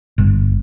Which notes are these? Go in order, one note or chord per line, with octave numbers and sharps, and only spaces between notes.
G1